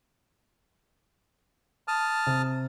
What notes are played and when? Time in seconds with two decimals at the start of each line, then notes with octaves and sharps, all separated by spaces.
1.88 A5 D#6 F6
2.27 C3